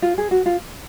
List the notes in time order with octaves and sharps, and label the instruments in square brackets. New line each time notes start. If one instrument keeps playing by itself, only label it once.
[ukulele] F4
G#4
F#4
F4